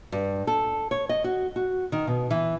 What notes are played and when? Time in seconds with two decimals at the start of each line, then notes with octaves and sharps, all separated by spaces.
0.12 G2
0.47 A4
0.91 C#5
1.09 D#5
1.24 F#4
1.56 F#4
1.92 D#3
2.07 B2
2.30 E3